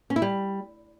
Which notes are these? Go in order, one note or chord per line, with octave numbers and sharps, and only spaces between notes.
C#4
E4
G3